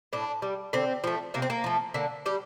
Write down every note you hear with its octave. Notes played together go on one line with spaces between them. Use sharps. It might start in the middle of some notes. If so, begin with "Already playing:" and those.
A2 D4
G3
D3 C4
F3 A3
C3 A#3
C4
A#3
F3 A3
D3 A#3
G3 G4